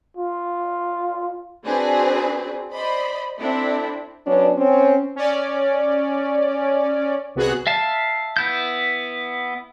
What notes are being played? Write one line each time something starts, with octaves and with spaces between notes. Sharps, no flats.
F4
C4 D4 F#4 G#4 B4 C5
C5 D5 D#5 B5
C4 D4 E4 A4
F#3 B3 C#4 D4
C4 C#4
C#4 D5
C2 B3 F#4 G#4 F#6
E5 F5 A5
B3 E4 G6